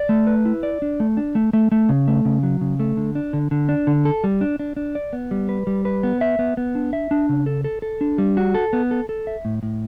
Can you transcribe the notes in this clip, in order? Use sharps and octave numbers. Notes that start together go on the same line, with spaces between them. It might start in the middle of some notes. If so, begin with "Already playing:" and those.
Already playing: D5
A3
B4
E4
D5
D4
A3
D4
A3
A3
A3
C#3
A3
C#3
F#3
C#3
A3
D3
D4
D3
D3
D4
D3
A4
G3
D4
D4
D4
D5
B3
G3
B4
G3
B4
B3
E5
B3
B3
D4
E5
D4
C#3
A4
A4
A4
D4
G3
F#4
A4
B3
A4
A4
E5
A2
A2